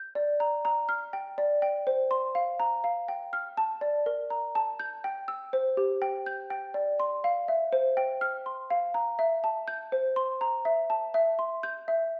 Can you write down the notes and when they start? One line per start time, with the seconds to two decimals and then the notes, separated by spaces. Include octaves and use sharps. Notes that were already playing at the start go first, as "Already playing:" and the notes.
Already playing: G6
0.15 D5
0.40 A#5
0.65 A#5
0.89 F6
1.13 G5
1.38 D5
1.62 G5
1.87 C5
2.11 C6
2.35 F5
2.60 A#5
2.84 F5
3.08 G5
3.33 F6
3.57 A5
3.81 D5
4.06 A#4
4.30 A#5
4.55 A5
4.79 G6
5.04 G5
5.28 E6
5.53 C5
5.77 G4
6.02 G5
6.26 G6
6.50 G5
6.74 D5
7.00 C6
7.24 F5
7.48 E5
7.73 C5
7.97 G5
8.21 F6
8.46 C6
8.70 F5
8.94 A#5
9.19 E5
9.44 A5
9.68 G6
9.92 C5
10.16 C6
10.41 A#5
10.65 E5
10.90 A5
11.14 E5
11.39 C6
11.63 G6
11.88 E5